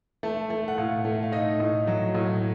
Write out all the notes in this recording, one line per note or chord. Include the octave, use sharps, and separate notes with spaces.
A3 A5
A3
F#5
A2 F5
A3
F5
D#4 D#5
A2
F#3
A2